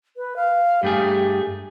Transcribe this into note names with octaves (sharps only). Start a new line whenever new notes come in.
B4
F5
G2 A3 G4 G#4